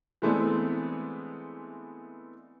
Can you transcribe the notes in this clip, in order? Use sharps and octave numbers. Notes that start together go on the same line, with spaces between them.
E3 G#3 A3 B3 C4 D4